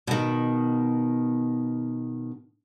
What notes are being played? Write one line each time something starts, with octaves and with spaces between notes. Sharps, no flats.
B2 D#3